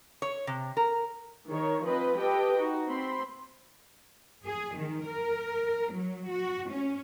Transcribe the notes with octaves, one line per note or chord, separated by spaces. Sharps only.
C#5
C3
A#4
D#3 C#5
F3 C4 B4 D#5 B5
G4 A4 B4 D#5 G5
D#4 F#4
C4 B5 C6
G#4
D#3
A#4
F#3
F#4
C#4